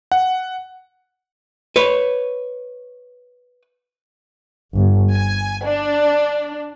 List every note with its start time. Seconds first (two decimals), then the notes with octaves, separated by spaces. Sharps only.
0.12 F#5
1.76 B4 C#5
4.75 G1
5.11 G#5
5.63 D4